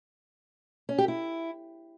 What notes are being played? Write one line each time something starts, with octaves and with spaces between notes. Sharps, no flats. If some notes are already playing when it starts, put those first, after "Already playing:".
C#4
G4
E4